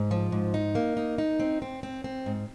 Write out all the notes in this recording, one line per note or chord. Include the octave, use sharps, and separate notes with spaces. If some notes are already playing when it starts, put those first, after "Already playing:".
Already playing: G#2
F3
G#2
D#4
A#3
D#4
D#4
C4
C4
C4
C4
G#2